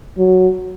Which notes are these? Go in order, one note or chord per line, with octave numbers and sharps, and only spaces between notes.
F#3